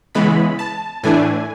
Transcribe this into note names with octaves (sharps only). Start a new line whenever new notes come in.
C#3 E3 G#3 B3 B5
A5
A2 E3 A3 D4 G#5